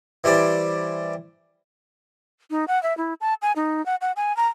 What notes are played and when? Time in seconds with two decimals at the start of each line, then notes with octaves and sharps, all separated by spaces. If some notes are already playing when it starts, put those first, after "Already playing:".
0.24 E3 G3 C5 D5
2.51 D#4
2.68 F#5
2.83 E5
2.98 E4
3.21 A5
3.42 G#5
3.56 D#4
3.86 F#5
4.01 F#5
4.16 G#5
4.37 A#5